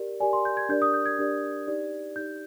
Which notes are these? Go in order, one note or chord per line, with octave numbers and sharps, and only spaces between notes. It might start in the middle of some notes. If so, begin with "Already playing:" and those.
Already playing: G4 A#4 D5
G4 A#4 D5 G#5
C6
G6
G#6
D4 G4 A#4 D5 G6
D#6
G6
G#6
D4 G4 A#4 D5
D#4 G4 D5
D#4 G4 D5 G6